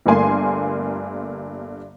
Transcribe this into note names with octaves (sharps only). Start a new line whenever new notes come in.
G1 G2 A3 A#3 G#5 C6